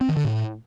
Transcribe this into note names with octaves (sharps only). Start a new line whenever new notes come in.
C4
D#3
D3
A2